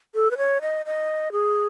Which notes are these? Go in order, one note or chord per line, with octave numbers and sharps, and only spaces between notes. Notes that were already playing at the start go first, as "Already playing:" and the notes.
A4
B4
C#5
D#5
D#5
G#4